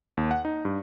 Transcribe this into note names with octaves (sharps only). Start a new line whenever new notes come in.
D#2
F#5
D#4
G2